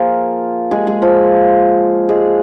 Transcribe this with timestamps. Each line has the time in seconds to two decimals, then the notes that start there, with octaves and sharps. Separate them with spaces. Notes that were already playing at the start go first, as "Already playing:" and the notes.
Already playing: F3 A#3 F4 G#4 A#4
0.71 G#3 G#4
0.87 G#3 G#4
1.02 F3 F4
2.09 G#3 G#4